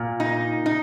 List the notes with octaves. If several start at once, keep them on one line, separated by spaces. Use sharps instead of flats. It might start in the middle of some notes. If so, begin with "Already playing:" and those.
Already playing: A#2
D#4
D#4